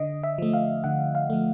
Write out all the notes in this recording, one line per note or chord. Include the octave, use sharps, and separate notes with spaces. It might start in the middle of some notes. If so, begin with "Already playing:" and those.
Already playing: D3 D#5
E5
F3 A3
F5
D3 F#5
F5
F3 A3